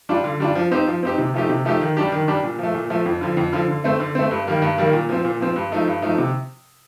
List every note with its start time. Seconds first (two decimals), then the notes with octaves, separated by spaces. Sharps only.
0.09 G3 D4 F4
0.24 D3
0.40 G3 D4 F4
0.55 F3
0.71 C4 D#4 G4
0.88 F3
1.03 C4 D#4 G4
1.18 C3
1.34 F3 A3 D#4 G4
1.49 C3
1.65 F3 A3 D#4 G4
1.81 D#3
1.97 G3 D4 G4
2.12 D#3
2.28 G3 D4 G4
2.43 A#2
2.59 F3 A3
2.74 A#2
2.90 F3 A3
3.06 F2
3.21 D3 F3
3.37 F2
3.53 D3 F3
3.69 D3
3.84 A3 C4
4.00 D3
4.15 A3 C4
4.31 G2
4.47 D#3 G3 A#3
4.62 G2
4.78 D#3 G3 A#3
4.93 A#2
5.09 F3 C4
5.25 A#2
5.40 F3 C4
5.56 G2
5.72 F3 A3 D#4
5.88 G2
6.02 F3 A3 D#4
6.18 C3